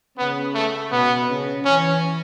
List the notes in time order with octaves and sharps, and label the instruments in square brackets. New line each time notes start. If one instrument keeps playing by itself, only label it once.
[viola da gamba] C#3 [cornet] B3
[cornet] A3
[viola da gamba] B2 [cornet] B3
[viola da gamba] C#3
[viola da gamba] E3 [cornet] C#4